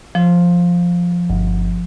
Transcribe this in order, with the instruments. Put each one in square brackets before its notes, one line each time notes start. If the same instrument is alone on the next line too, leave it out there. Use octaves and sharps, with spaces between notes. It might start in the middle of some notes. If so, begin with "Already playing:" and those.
[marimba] F3
[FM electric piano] G1